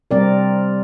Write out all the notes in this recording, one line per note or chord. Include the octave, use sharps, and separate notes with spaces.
C3 G3 C4 A#4 D5